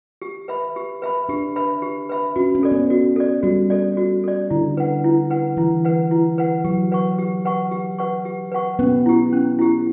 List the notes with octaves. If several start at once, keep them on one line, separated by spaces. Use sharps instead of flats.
G4
B4 E5 B5
G4
B4 E5 B5
D4 G4
B4 E5 B5
G4
B4 E5 B5
C#4 F#4
C#4
A4 D5
B3
F#4
A4 D5
G3 F#4
A4 D5
F#4
A4 D5
D3 E4
B4 F#5
E4
B4 F#5
E3 E4
B4 F#5
E4
B4 F#5
F#3 G4
B4 F#5 C#6
G4
B4 F#5 C#6
G4
B4 F#5 C#6
G4
B4 F#5 C#6
B3 C#4
E4 G4
C#4
E4 G4